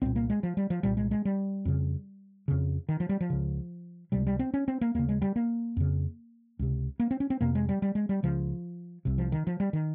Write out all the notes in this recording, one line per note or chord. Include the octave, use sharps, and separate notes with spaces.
C2 A#2 C4
A#3
G#3
F3
G3
F3
C2 A#2 G3
G#3
G#3
G3
F2 C#3
F2 C#3
D#3
F3
G3
F3
C#2 C#3
C#2 C3 G3
G3
C4
C#4
C4
A#3
D#2 C#3 A#3
G#3
G3
A#3
F2 C#3
C#2 C3
A#3
C4
C#4
C4
F2 C3 A#3
G#3
G3
G3
G#3
G3
C#2 C#3 F3
C2 C3
F3
D#3
F3
G3
D#3